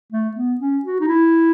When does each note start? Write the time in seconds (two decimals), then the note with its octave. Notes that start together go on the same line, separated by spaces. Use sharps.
0.12 A3
0.36 B3
0.61 C#4
0.85 F#4
1.00 D#4
1.08 E4